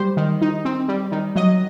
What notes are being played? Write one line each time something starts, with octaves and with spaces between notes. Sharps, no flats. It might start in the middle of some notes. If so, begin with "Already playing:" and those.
Already playing: G3 C5
D#3
D#4
C4
G3
D#3
F#3 D#5